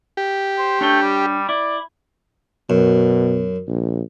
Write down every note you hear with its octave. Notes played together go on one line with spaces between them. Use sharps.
G4
C5
A3 D4 C#5 G5
G3
E4 D5
F#2 B2
A#1